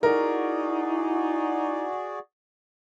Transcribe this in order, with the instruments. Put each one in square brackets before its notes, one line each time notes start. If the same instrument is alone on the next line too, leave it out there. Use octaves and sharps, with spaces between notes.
[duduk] D#4 [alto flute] E4 [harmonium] F#4 G#4 D5 [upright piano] A#4